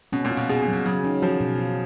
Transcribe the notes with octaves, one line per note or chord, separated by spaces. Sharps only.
B2 C#4
A#2
F4
B2
B2 G#4
B2
F#3
B2
C#3 F#3
D#3 C#4
F3 F#4
B2
F4